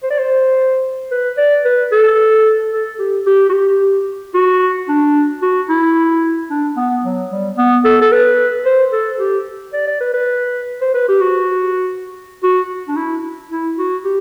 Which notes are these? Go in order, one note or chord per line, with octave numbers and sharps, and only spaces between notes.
C5
D5
C5
B4
D5
B4
A4
A4
G4
G4
F#4
G4
F#4
D4
F#4
E4
D4
B3
F#3
G3
B3
A4
A4
B4
C5
A4
G4
D5
D5
B4
B4
C5
B4
G4
F#4
F#4
D4
E4
E4
F#4
G4